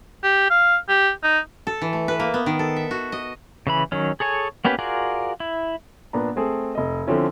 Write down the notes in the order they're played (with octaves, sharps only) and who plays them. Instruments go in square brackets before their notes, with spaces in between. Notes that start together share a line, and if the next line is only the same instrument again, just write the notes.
[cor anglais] G4
F5
G4
D#4
[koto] A4
E3
A3
B4
A#3
B3
D#3
A4
E5
F#4
D#5
[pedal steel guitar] C#3 E3 B5
D#3 F#3 C#4
G#4 A4 C#5 G#5
A#3 B3 C#4 G4 B4
F4 F#4 G#4 A#4 D5
E4
[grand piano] A#2 B3 D4 A#5
A3 C4 G#4 A4
F1 D#5
D3 F3 C4 C#4 E4